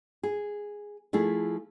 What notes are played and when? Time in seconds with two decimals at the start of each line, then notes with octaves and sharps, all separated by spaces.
0.23 G#4
1.13 F3 A3 E4 G#4